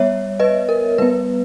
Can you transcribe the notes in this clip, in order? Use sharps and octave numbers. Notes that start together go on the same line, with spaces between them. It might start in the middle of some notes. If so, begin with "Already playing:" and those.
Already playing: G3 B3 C#5 E5
B4 D#5
A#4
G3 B3 B4